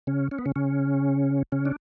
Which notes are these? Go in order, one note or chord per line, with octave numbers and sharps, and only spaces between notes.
C#3 C#4
C#4
B3
C#3 C#4
C#3 C#4
C#3 C#4
D4